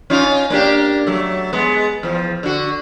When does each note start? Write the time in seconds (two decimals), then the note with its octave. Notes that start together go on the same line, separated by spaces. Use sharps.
0.10 C#4 D#4 F4
0.50 A#3 D4 G4
1.06 F#3 A3
1.53 G#3 B3
2.03 E2 F3
2.43 D3 F#4